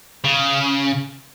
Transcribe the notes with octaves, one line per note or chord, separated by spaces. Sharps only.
C#3